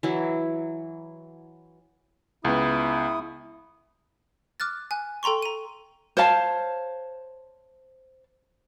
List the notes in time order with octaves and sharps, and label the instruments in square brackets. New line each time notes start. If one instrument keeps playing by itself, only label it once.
[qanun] E3 F#3 E4
[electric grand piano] C#2 B3 [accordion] E4 D#6
[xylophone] D6 F6 F#6 A6
G#5 F#6
A4 G5 A#5 C6 C#6
A#5 D#7
[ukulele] C5 C#5 F5 A5